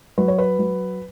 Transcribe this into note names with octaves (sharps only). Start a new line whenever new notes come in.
F#3 B4
C#5
B4
F#3